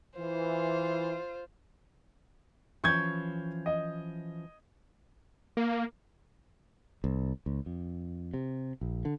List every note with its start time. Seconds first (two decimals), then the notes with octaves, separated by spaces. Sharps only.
0.18 E3 F4 C5
2.84 E3 F3 C#4 C#6 G6 G#6
3.66 D#5
5.57 A#3
7.04 C2
7.46 C#2
7.66 F2
8.34 C3
8.81 A#1
9.05 D3